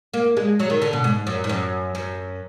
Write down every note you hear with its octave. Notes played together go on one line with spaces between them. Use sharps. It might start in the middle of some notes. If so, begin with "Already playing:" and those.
A#3
G#3
F#3
D#3
D3
B2
G#2
F#2
G#2
F#2
F#2